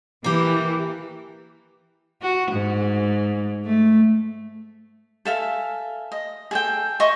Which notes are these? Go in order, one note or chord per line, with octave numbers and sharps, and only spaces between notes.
E3 A#3 G4
F#4
G#2
A3
A4 E5 F5 G#5
D#5
G#4 A4 G5
D#5 E5 C#6